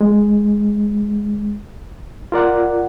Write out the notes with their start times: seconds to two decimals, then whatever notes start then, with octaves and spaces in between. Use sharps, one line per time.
0.01 G#3
2.32 F4 A#4 D5 F#5